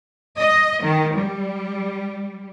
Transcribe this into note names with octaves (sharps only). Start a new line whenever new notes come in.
D#5
D#3
G3